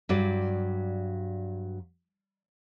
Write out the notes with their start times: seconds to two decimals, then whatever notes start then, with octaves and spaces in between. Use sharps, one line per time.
0.09 G2 F#3 D5